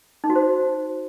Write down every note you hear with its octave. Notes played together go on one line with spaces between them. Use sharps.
D#4
F#4
C5